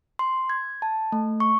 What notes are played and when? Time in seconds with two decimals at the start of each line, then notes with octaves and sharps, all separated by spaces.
0.19 C6
0.50 G#6
0.82 A5
1.12 A3
1.40 C#6